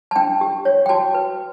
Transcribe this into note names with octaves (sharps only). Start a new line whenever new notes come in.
A5
D4 G5
G4
C#5
G5
F#4 A5
B4